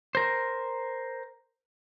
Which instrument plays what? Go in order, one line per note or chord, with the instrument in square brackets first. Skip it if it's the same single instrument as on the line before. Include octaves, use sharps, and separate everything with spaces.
[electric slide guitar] A#4 C5